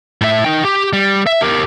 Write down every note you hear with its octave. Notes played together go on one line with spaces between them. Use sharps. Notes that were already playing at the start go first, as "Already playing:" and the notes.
A2 E5
D#4 G5
G4
G3
E5
G4 A#4